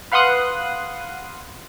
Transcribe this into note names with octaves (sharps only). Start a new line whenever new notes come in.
B4 F5 F#5 C6 D#6 F#6